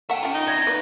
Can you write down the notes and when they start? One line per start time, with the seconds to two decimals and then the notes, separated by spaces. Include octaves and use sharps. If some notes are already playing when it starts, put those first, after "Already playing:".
0.10 A3 A#3 E5 F#5 G5
0.23 C#4 F4
0.34 D#4
0.48 E4 D5 G#6 A#6
0.67 A#3 B3 B4